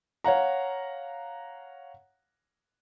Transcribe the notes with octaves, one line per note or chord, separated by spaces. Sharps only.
C#5 F5 F#5 A#5